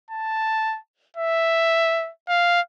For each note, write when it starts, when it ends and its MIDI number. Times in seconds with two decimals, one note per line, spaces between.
0.11 0.79 81
1.17 2.11 76
2.29 2.61 77